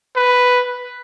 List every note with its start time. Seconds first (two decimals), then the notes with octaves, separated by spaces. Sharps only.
0.16 B4